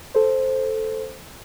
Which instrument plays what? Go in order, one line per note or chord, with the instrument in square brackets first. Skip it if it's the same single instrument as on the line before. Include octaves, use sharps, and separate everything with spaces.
[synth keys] A4 C5